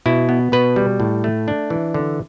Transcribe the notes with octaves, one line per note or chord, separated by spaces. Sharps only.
B2 E4
B3
B2 B4
G3
A2
A3
D4
E3
D3